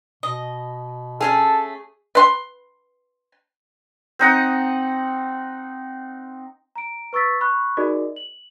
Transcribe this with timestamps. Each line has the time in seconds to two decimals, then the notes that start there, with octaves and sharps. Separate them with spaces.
0.23 B2 D#5
1.21 A3 C#4 G#4 A4 F5
2.15 B4 C6
4.19 C4 D#4 F#5
6.76 A#5 D7
7.13 B4 C#6 E6 A6 B6
7.41 B5 C#6 F#6
7.77 D#4 F#4 G#4 A#4 D5 D#5
8.16 F#7